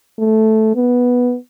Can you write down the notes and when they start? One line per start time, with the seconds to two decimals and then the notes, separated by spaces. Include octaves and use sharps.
0.19 A3
0.75 B3